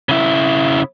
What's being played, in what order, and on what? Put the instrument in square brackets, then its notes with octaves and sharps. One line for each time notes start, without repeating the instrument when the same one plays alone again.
[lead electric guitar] C#3 E4